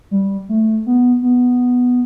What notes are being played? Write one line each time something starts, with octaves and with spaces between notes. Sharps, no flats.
G3
A3
B3
B3